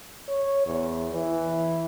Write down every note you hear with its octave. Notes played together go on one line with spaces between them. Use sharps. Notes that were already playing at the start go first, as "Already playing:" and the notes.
C#5
E2
E3